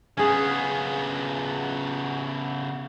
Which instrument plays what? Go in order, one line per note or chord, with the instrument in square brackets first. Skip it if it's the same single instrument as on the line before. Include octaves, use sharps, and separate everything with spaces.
[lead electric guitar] C#3 B3 [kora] C#4 G#4